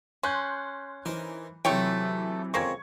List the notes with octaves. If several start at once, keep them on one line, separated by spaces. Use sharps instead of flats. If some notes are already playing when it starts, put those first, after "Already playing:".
C#4 C6 F#6 G6
E3 D#4 A#4 C5
C3 E3 F#3 A3 F4 C#5 G5
F2 C#3 G#3 A#3 C4 C#6 G#6